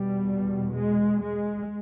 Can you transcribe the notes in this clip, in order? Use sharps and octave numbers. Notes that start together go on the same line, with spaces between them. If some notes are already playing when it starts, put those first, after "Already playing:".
Already playing: E2 B2 G3
G#3
G#3